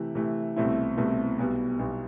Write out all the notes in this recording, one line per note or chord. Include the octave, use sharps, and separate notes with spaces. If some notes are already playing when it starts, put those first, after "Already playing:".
Already playing: C3 E3 A3
C3 E3 A3
C2 B2 A3 C4 E4
C2 B2 A3 C4 E4
B1 B2 G3
B1 B2 G3